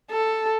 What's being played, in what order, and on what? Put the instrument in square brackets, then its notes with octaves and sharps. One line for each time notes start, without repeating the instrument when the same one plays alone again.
[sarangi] A4